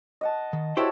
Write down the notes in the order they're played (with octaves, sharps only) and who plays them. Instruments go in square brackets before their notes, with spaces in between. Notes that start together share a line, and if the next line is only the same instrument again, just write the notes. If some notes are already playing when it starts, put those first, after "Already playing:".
[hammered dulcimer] D#5 F#5 A5
[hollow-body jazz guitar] D#3
[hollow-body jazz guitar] E4 G4 C5 [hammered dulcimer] F#4 A4 C#5